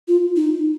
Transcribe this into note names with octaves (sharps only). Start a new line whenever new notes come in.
F4
D#4